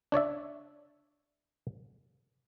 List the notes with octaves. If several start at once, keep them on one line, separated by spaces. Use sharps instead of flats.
D4 C#5 D5 E5